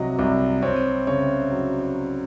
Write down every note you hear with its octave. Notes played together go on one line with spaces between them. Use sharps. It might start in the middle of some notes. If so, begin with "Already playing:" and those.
Already playing: C2 C3 F#3 D#5
C2
C4 C#5
C#3 C#5
F#3